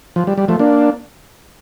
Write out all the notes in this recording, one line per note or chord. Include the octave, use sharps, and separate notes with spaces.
F3
G3
G3
F3 A3
A#3 D4